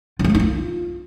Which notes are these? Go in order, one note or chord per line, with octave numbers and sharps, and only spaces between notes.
F4
A3
A#3
D#4
F4